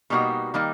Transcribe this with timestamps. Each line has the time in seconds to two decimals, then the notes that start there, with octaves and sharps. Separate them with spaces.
0.10 B2 G3 A#3 D#4 F#4
0.54 D#3 G3 A#3 D#4